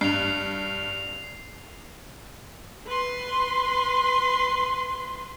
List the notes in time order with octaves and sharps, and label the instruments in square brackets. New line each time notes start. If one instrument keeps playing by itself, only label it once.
[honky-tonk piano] G2 [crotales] C7 F7
[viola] B4 C6